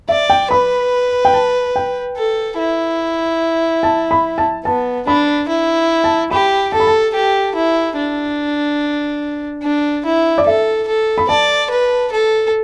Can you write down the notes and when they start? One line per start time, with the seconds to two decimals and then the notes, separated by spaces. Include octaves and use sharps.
0.09 D5 E5
0.30 G5
0.51 B4 B5
1.25 G5
1.34 A5
1.76 G5
2.17 A4
2.58 E4
3.83 A5
4.11 B5
4.38 A5
4.65 B3 A5
5.06 D4 B5
5.48 E4
6.04 A5
6.31 G4 B5
6.72 A4 A5
6.80 B5
6.87 A5
7.15 G4
7.55 E4
7.97 D4
9.63 D4
10.05 E4
10.38 D5
10.46 A4 E5
10.87 A4
11.18 B5
11.29 D5 A5
11.70 B4
12.12 A4